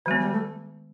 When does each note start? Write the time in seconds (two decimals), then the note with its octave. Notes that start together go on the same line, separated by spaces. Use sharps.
0.06 D#3 F#3 G#3 B3
0.20 G3
0.33 A3